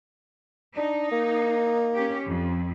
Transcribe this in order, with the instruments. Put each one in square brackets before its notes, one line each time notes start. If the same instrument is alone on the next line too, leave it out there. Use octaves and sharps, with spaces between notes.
[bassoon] D4 [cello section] D#4
[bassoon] A#3
[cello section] C#4 G4
F2